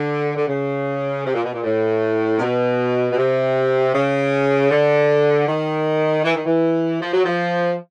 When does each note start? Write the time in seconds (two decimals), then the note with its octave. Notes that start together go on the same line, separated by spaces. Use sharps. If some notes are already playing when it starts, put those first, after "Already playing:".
Already playing: D3
0.36 D3
0.48 C#3
1.25 C3
1.34 A#2
1.44 B2
1.54 A#2
1.63 A2
2.36 C3
2.40 B2
3.11 B2
3.17 C3
3.94 C#3
4.71 D3
5.48 D#3
6.24 E3
6.35 D#3
6.46 E3
7.01 F3
7.13 F#3
7.25 F3